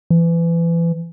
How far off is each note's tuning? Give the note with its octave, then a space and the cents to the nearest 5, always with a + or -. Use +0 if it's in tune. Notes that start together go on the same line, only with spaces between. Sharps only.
E3 +30